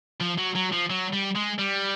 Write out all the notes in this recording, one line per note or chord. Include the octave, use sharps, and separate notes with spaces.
F3
F#3
F#3
F3
F#3
G3
G#3
G3